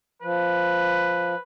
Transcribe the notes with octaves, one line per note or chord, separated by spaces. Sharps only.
F3 B4